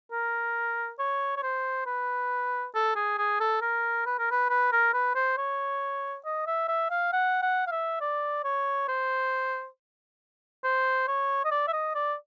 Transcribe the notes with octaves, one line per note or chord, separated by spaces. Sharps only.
A#4
C#5
C#5
C5
B4
A4
G#4
G#4
A4
A#4
B4
A#4
B4
B4
A#4
B4
C5
C#5
D#5
E5
E5
F5
F#5
F#5
F5
E5
D5
C#5
C5
C5
C#5
D#5
D5
E5
D#5
D5